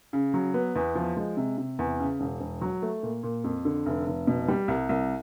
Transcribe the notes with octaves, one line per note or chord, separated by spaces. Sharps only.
C#3
F#3
B3
E2
F3
G#3
C3
C3
E2
C#3
E1
E1
F#3
A3
A#2
A#2
F2
D3
F1
F1
B2
G3
C2
C2